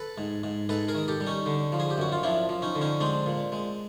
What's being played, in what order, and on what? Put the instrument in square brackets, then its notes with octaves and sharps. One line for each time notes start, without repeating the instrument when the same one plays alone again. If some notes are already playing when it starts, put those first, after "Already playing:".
Already playing: [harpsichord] A4 B4
G#2
G#2
G#2 A4 B4
G#4 A#4
D#3
G4 A4
G3
C#4 D#4
D3
F3
G#4
G4
F#2 F#4
F4
F3 D4 E4
F3
C#4 D#4
D3
C#4 D#4
G#3 C4 D4
A#2
G#3